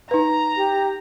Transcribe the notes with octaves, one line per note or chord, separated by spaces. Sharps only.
D#4 B4 A#5
G4